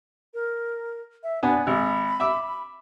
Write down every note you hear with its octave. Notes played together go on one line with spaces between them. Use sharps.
A#4
E5
B3 D4 D5 G#5
G#1 B5
E5 D6 E6